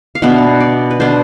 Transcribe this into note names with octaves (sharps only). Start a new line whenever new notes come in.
F5
B2 B3 D4 E5
D5
B4
B2 B3 D4 C5